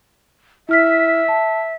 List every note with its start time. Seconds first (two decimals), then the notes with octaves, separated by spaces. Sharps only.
0.69 E4 E5 F6 B6
1.28 A5